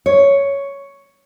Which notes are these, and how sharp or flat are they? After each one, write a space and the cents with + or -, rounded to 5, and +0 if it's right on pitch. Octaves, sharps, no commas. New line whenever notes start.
C#5 +5